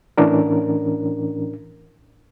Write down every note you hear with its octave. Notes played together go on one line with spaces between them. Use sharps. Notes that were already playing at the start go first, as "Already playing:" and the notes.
A2 E3 C#4 D4 A#4